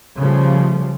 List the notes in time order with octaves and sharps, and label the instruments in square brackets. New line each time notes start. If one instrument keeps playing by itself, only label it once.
[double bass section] C#3 F3 G3 A3